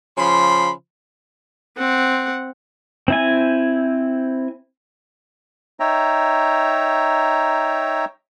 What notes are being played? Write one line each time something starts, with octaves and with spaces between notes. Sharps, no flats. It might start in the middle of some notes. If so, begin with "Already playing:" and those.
C#3 F3 B5 C6
C4 F#5
C4 E4 G#5
D#4 C#5 E5 G5 A#5